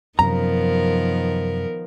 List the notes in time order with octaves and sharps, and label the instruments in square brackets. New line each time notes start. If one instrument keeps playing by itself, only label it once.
[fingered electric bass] F#2 C3 [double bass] D#3 F3 [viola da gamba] B3 A#4 [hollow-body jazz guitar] A#5